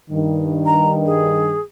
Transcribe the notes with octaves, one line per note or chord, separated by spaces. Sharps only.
G2 D#3
A#5
G#4